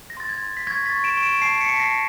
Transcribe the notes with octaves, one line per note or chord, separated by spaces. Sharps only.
A#6
C6 A6
G#6
C6
B6
C#6 G#6 A#6
A6 B6
C#6
D7 E7
C#6
D7 E7
A5 C7 D7
B6 C#7
A5
B6
A#6 C7
A5